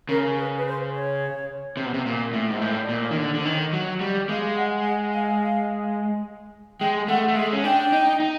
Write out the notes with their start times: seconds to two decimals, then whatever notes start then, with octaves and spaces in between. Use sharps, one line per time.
0.09 C#3 A#4
0.37 B4
0.57 B4
0.66 C5
0.94 C#5
1.77 C3
1.86 B2
1.94 C3
2.06 A#2
2.33 A2
2.50 G#2
2.61 A2 C#5
2.82 D5
2.89 A#2
3.03 C#5
3.11 D#3
3.17 D3
3.34 D3
3.40 C5
3.45 D#3 C#5
3.73 F#3
4.01 G3 D#5
4.29 G#3 F5
4.56 F#5
4.85 F#5
5.13 F5
6.81 G#3 G5
7.08 A3 F#5
7.28 A3
7.36 G#3 E5
7.53 C#4
7.64 D4 G5
7.92 D#4
8.20 D#4